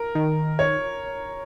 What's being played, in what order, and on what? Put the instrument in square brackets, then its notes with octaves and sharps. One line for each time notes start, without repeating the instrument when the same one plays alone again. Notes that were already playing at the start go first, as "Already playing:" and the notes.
Already playing: [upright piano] A#4
[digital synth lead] D#3
[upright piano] C#5